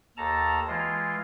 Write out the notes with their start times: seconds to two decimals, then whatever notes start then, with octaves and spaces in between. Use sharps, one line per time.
0.17 D#2 A4 A5 A#5
0.68 E3 G#3 F4